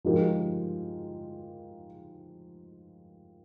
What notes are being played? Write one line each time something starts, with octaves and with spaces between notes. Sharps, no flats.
F3 G#3 D#4 G4 A#4